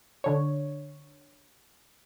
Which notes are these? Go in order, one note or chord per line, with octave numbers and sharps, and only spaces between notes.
D3 C#5